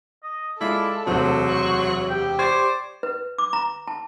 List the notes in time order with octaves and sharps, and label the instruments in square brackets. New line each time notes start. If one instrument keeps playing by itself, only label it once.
[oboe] D#5
[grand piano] G#3 F4 [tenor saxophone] E4 [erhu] A4 [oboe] D5
[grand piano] E1 D2 C3 [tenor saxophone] F#3 [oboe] C5
[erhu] C#6
[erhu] G4 [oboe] G5
[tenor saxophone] C5 [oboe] D5 [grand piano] C6 C#6 G#6
[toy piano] B4
D6
A#5
A5